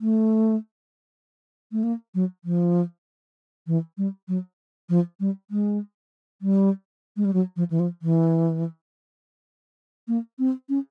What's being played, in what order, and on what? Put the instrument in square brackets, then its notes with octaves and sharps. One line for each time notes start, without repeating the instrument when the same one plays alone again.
[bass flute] A3
A3
A#3
F#3
F3
E3
G3
F#3
F3
G3
G#3
G3
G#3
G3
F#3
F3
E3
F3
E3
A#3
C4
C#4